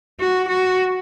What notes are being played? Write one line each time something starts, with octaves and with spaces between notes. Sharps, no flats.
F#4
F#4